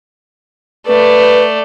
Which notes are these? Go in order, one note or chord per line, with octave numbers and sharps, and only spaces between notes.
A3 B4 D5